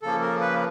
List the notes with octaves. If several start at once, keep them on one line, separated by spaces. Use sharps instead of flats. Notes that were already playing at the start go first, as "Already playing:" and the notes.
C#3 F3 A#3 A4
A#4
B4